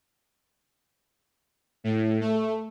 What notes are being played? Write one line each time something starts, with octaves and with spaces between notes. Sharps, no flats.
A2
A3